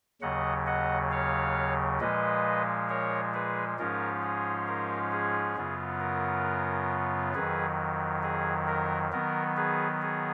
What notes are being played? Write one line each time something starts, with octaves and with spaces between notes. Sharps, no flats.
D#2 C#3 F#3 D#5 F#5
D#5 F#5
C#5 F5
A#2 F3 G#3 B4 D#5
A#4 C#5
G#4 B4
G#2 F3 G#3 C#4 F4 A#4
G#4
A#4
G#4
F#2 C#3 F#3 B3 F4
A#4
F2 D#3 F#3 G#4 B4
G#4
A#4
D#3 F#3 B3 A#4
G#4 B4
G#4